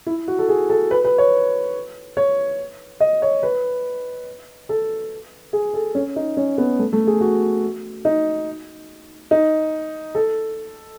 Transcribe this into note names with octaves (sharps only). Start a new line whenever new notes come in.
E4
F#4
A4
G#4
A4
B4
B4
C#5
C#5
D#5
C#5
B4
A4
G#4
A4
C#4
D#4
C#4
B3
A3
A3
G#4
F#4
D#4
D#4
A4